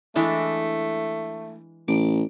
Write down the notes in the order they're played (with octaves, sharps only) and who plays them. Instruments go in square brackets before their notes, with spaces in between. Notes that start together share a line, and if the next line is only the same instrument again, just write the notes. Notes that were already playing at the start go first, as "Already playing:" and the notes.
[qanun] E3 G#3 D4 [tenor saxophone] A3
[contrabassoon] A1 [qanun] D6